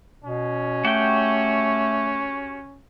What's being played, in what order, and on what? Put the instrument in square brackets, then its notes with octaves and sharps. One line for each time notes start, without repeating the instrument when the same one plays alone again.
[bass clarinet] B2 [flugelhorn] C#4
[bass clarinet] A3 [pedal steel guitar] F#4 G4 G5